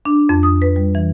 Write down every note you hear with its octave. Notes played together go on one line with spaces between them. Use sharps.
D4
F2
D#6
B4
G3
E3